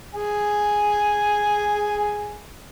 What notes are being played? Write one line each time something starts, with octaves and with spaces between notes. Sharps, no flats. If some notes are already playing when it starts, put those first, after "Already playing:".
G#4 G#5